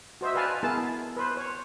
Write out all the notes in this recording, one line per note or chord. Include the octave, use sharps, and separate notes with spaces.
F#4 C5 D#5 E5
B4 D5 F5 G#5 A5
B3 E4 G#4 A#4 A5
B4 C5
C#5